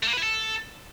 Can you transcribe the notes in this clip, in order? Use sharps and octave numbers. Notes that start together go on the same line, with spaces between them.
A3
A#3
B4
E4
A4